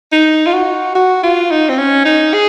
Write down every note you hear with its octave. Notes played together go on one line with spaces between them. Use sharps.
D#4
F4
F#4
F#4
F4
D#4
C4
C#4
D#4
G#4